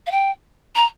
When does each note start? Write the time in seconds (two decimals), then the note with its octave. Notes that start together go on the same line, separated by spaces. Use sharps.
0.06 F5
0.11 G5
0.75 A#5